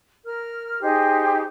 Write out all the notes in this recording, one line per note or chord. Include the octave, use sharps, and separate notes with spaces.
A#4 F6
D#4 G4 G#4 C5